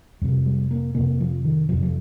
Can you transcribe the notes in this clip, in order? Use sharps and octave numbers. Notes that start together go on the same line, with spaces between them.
F2 C3 G3
G3
A#3
F2 C3 A#3
F3
D#3
F2 C3 F3
F3